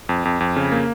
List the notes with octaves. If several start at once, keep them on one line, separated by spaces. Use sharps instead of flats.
F2
F2
F2
C#3
A#3